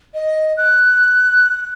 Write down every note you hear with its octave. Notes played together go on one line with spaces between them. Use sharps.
D#5
F#6